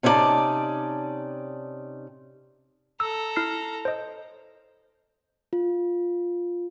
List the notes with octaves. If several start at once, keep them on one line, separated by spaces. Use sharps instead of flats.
C3 C#4 D#4 E4 D5 A5
A4 A#5 E6
E4 F6 C7
C5 D#5
F4